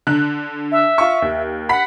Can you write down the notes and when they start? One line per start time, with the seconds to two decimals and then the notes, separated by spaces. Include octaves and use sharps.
0.07 D3 F#6
0.72 E5
0.98 F4 C#6
1.22 D#2
1.69 F#5 B5 B6